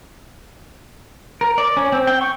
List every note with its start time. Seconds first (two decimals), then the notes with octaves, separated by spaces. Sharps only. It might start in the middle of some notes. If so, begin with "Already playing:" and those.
1.41 A#4
1.58 D5
1.77 C#4
1.92 C4
2.07 G5
2.21 C#6